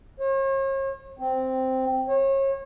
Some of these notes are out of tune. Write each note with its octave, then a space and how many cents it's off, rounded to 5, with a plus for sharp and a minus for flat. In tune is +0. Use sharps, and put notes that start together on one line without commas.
C#5 -45
C4 -5
C#5 -35